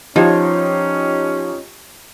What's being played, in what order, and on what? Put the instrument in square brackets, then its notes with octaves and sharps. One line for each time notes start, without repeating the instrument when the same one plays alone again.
[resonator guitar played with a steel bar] F3 C#5 [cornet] C#4 [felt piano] D#4 F4 G4